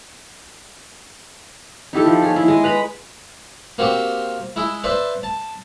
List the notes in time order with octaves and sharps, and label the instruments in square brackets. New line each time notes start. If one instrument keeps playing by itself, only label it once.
[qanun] D#4 E4 G4 A4
F3
G#4 C#5
E4
G#3 D#5
B4 A#5 B5
[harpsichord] A#3 C4 F#4 G4
G#3 E4
B4 C5 D5 E5
A5